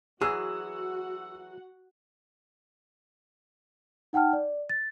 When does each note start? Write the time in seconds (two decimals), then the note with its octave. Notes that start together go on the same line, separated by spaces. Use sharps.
0.22 E3 F#3 F#4 G#4 F#5 E6
4.13 D#4 F#5 G5 A5 F6
4.33 D5
4.70 A6